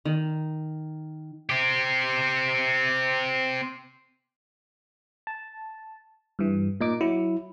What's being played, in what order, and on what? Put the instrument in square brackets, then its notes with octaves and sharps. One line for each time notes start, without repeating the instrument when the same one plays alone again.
[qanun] D#3
[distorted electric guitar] C4 G4
[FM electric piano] A5
G2 E3
A#2 D#4 D6
[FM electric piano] F#3 [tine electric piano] E4